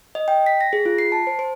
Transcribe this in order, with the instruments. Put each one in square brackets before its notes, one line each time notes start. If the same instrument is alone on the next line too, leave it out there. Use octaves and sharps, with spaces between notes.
[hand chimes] D#5
G5
B6
A#6
G#4
F4
C7
A5
C5
C5